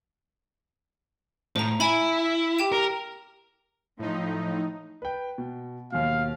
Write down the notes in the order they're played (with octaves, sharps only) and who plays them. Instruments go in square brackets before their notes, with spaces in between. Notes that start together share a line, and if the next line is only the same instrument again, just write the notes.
[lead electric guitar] A2 [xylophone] C5 A#5
[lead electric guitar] E4 [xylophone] G#5 B5
[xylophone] G4 G5 E7
[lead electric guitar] A#4
[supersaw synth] A2 D#4 [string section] F3
[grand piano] B4 G5
B2
[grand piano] D#2 B2 [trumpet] F5